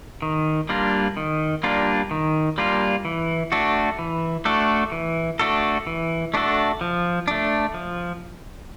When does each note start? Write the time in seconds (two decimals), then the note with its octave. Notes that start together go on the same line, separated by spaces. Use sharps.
0.22 D#3
0.69 G3 A#3 D4 F4
1.17 D#3
1.63 G3 A#3 D4 F4
2.11 D#3
2.58 G3 A#3 D4 F4
3.05 E3
3.52 A3 D4 F#4 A4
3.99 E3
4.45 A3 D4 F#4 A4
4.92 E3
5.39 A3 D4 F#4 A4
5.87 E3
6.34 A3 D4 F#4 A4
6.81 F3
7.28 A3 D4
7.74 F3